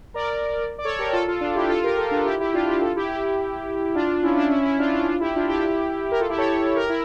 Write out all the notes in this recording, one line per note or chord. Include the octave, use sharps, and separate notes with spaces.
A#4 D5
D5
A4 C#5
G4 A#4
F4 A4
F4 A4
D4 F4
E4 G4
F4 A4
G4 A#4
F4 A4
D4 F4
E4 G4
E4 G4
D4 F4
E4 G4
F4 A4
E4 G4
E4 G4
D4 F4
C#4 E4
D4
C#4 E4
C#4 E4
D4 F4
D4 F4
E4
D4 F4
E4 G4
D4 F4
E4 G4
A#4
F4 A4
E4 G4
A4 C#5
G4 A#4
E4